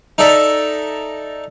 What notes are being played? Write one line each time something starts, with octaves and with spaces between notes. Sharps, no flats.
D#4 A4 D5 E5 A5 A#5